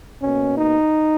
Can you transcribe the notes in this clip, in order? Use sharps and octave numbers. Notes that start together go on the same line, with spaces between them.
B2 A#3 C#4
D#4